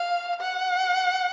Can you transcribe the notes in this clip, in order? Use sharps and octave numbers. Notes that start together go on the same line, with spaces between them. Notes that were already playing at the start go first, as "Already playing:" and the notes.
Already playing: F5
F#5